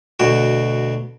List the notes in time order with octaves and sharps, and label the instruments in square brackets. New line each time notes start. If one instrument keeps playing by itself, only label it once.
[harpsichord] D2 B2 F#4